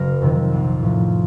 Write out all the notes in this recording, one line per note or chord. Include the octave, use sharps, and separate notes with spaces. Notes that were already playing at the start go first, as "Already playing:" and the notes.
Already playing: F#1 A#4
F2 C3 D#3
A#1
A2 F3